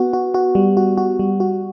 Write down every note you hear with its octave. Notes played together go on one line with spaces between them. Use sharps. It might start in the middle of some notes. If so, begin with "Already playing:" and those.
Already playing: B3 F#4
F#4
F#4
G3
F#4
F#4
G3
F#4